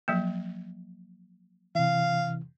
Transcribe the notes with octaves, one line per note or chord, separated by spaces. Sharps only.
F3 F#3 A#3
C3 E3 F5